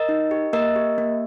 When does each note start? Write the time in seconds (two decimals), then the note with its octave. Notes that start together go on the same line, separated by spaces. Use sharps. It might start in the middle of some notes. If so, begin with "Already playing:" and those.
Already playing: A#4 D#5
0.09 D#4
0.31 G4
0.53 A#3 A#4 D#5
0.76 G4
0.98 A#3